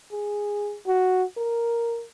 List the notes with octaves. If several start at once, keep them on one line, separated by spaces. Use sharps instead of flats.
G#4
F#4
A#4